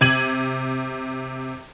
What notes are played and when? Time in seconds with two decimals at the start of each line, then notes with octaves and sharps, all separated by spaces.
0.01 C3 G#6 D#7 F#7